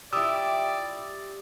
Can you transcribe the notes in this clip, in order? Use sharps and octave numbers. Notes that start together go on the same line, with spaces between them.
A2 F3 E4 G4 D5 E5 D#6 E6